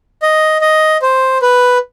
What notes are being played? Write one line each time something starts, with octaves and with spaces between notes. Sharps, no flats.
D#5
D#5
C5
B4